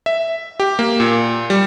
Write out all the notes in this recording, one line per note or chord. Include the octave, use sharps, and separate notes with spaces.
E5
G4
A#3
A#2
G3